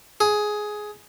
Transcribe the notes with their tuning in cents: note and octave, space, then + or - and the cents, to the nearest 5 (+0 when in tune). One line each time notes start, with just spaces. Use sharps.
G#4 +10